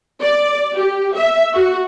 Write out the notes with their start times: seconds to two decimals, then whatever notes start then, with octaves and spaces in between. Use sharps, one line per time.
0.22 D5
0.75 G4
1.17 E5
1.54 F#4